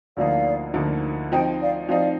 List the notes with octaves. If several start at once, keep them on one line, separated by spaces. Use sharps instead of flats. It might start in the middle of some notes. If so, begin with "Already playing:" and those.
D2 D3 F3 A#3 D#4 D5 F5
D2 D3 F3 A#3 D#4
F3 C4 D#4 D#5 G5
D5 F5
F3 C4 D#4 D5 F5